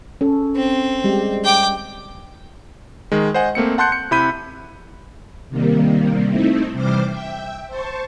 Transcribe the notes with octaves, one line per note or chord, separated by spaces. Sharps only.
C#4 A4
C4
G3 G#3 G4
G5 D6
D#3 G#3
C5 D#5 F#5 G#5
A3 A#3 C4 C#7
F#5 A5 C6 F#6 G6 C#7
C#7
C3 E4 B5 G6 D#7
C3 D#3 G3 A#3
A3 C4 D#4 E4
C3 E3 G3 C5 D6 F6
E5 G5
C5 A5 C#6